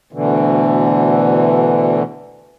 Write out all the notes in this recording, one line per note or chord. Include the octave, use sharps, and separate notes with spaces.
D2 B2 D3 E3